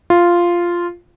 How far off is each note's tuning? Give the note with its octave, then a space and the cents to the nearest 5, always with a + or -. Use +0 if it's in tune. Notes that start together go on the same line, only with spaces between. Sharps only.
F4 -5